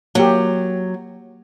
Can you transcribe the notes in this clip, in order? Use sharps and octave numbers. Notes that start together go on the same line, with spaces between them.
F#3 A#3 G4